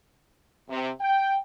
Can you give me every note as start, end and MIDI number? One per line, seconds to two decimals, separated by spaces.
0.70 0.89 48
1.01 1.37 79